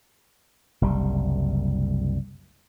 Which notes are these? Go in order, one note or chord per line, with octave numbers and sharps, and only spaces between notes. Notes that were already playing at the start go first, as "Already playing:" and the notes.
F#1 C2 G3